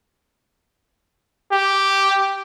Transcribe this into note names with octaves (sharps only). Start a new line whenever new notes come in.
G4